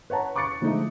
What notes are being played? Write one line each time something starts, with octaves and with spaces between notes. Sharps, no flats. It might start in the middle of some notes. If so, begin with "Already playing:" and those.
B4 C#5 F#5 A5 A#5
C#6 D6 F#6 A6 C#7
D3 F3 G#3 A3 D#4